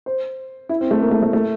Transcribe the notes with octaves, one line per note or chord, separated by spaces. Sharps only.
C5
E4
C4
A3
A#3
A3
A3
A3